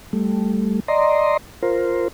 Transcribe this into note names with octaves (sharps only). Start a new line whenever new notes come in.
G3 A3
D5 D#5 A#5 C6
F4 A#4 C5